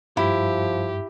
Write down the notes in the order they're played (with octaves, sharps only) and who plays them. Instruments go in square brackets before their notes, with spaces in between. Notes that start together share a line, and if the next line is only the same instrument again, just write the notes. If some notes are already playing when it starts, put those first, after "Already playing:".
[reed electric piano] G2 [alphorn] F3 [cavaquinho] E4 [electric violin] G4